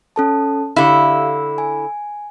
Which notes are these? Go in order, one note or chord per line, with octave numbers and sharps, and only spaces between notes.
C#4 A4 A5
D3 E4 G4 F5
G#5